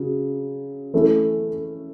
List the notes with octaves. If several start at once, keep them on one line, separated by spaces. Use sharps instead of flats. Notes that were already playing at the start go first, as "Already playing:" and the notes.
Already playing: C#3 F#3
E3 A3 C#4 E4